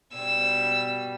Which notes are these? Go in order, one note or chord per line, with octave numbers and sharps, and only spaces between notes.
B2 G3 E6